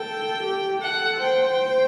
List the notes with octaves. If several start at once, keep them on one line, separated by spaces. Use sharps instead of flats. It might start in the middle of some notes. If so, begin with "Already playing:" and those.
Already playing: A4 G5
G4
A4 F#5
C5 G5